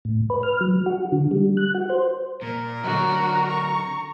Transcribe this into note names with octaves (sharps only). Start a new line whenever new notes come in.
A2
B4
F6
F#3
F#4
D3
G3
F#6
F#4
C5
A#2 A#4
D3 F#3 F#4 A#5
C#6